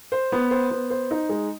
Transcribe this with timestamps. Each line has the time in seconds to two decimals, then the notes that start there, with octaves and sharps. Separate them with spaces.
0.12 C5
0.32 B3
0.51 C5
0.71 B3
0.90 C5
1.11 D#4
1.29 G#3